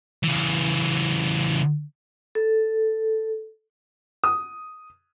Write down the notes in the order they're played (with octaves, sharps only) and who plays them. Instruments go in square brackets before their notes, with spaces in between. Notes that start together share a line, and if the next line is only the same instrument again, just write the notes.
[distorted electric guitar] C#3 E3
[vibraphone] A4
[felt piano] D#6